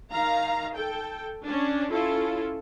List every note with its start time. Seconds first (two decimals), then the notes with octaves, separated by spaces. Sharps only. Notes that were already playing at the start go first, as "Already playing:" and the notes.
0.12 D#3 F5 A#5
0.75 A4 G5
1.44 C#4 D4
1.90 C#4 E4 F4 A4